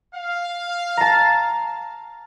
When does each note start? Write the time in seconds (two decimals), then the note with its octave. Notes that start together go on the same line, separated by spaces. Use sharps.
0.14 F5
0.97 A5 A#5